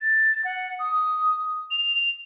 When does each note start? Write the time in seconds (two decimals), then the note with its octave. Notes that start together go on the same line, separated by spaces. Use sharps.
0.01 A6
0.44 F#5
0.79 D#6
1.71 F7